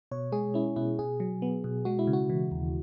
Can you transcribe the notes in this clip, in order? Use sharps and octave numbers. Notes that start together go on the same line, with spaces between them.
B2 C#5
G#3 G#4
C#4 E4
B2 E4
B2 G#4
F#3
B3
B2
G#3 F#4
E4
C#3
F#4
E3
D#2